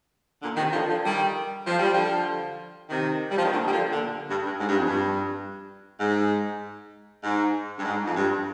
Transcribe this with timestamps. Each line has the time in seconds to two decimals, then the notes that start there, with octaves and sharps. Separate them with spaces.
0.42 A#2 D3
0.57 C3 D#3
0.72 D3 F3
0.88 D3 F3
1.04 D#3 G3
1.66 F3
1.79 G3
1.93 D3 F3
2.89 C3 D#3
3.31 G3
3.37 F3
3.44 D#3
3.51 A#2 D3
3.66 G3
3.72 D3 F3
3.93 A#2 D3
4.29 G2
4.44 G2
4.60 G#2
4.69 G2
4.78 F2
4.86 G2
5.99 G#2
7.23 G#2
7.79 G2
7.85 G#2
8.07 F2
8.16 G2